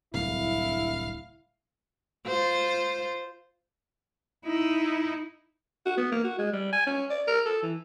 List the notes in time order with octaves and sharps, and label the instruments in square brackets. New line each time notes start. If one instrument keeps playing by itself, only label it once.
[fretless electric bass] D1 C2 [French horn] E4 [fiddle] F5
[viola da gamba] F4 C5
[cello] D#4 E4
[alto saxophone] F#4
B3
A#3
F#4
G#3
G3
G#5
C#4
D5
A#4
A4
E3